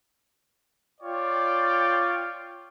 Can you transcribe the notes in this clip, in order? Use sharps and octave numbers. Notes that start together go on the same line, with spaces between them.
F4 C#5 D5 G5